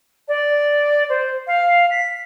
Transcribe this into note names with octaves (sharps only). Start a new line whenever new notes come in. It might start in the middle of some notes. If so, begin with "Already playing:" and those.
D5
C5
F5
B6